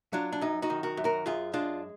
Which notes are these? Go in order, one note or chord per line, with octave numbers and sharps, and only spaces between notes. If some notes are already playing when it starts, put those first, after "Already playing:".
F#3 D4 F4
D4
F#2 D#4
D#4 F#4
D#3
F#4 A#4
F#2
F#4 A#4
F#2 F4 G#4
G#3 D4 F4